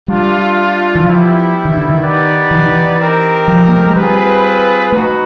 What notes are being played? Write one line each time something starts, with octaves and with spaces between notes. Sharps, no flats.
G3 A3 D4 F4
E3
F3 G3 B3 E4 G4
D#3
D3
D#3
B3 D#4 G4 B4 D5
E3
D#3
E3
C4 D#4 G4 A#4
F3
A#3
A3
G#3
G3 C4 F4 G#4 B4
A3 D#4 F#4 B4